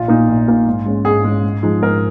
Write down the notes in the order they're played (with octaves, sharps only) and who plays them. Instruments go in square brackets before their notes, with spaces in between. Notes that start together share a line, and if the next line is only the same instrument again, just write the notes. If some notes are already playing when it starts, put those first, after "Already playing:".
Already playing: [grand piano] A#1 F4
A#2 A#3 D#4
A#1
A#2 A#3 D#4
G#2
G#3 C#4
G#2 G#4
G#3 C#4
G#2
F3 G#3 D#4
G#2 A#4